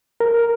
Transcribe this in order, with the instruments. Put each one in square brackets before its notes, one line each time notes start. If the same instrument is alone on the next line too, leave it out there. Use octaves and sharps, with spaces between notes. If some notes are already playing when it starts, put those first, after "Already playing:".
[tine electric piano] A#4